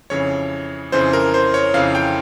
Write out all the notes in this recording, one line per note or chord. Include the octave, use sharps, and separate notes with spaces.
F2 C#3 E3 C#5
F2 C#3 E3 C5
A#4
C5
C#5
F2 C#3 E3 F5
G5